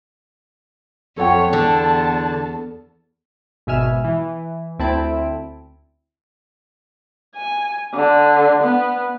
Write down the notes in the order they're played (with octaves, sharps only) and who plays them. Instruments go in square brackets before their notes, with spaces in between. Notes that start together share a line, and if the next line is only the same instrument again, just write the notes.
[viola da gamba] F2 [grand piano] A4 F#5 G5 [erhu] C#5
[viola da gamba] E2 [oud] D3 [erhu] A5
[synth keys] G#1 B2 E5 G#5 F6 E7
E3
D2 C4 E4 A5 B5 D7
[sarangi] G#5
D3
B3